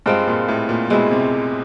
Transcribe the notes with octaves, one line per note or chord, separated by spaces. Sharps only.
G2 G#3 C4 F4
A#2
A2
A#2
B2 G#3 C4 E4
C3